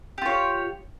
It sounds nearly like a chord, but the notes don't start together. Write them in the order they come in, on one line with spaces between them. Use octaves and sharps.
G4 F4 C#5